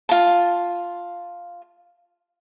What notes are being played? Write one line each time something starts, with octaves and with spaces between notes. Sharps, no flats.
F4 A5